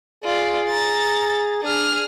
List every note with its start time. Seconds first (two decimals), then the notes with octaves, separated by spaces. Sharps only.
0.24 F4 G#4 D5
0.69 A#5 A6
1.63 D4 G#4 F6